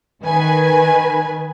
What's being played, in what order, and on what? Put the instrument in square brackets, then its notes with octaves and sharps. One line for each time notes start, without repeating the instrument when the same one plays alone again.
[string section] D#3 B4 G#5